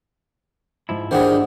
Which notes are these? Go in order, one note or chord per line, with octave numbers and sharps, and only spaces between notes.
G#2 F3 E4
D#3 D4 G4 G#4 C5 F#5